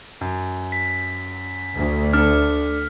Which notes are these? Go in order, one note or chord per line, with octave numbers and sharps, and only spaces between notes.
F#2
B6
D2
D4 A4 F6